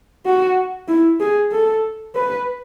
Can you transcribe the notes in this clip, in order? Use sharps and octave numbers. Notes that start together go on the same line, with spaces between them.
F#4
E4
G#4
A4
B4